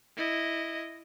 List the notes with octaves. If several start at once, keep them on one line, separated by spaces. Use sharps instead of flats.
E4 D#5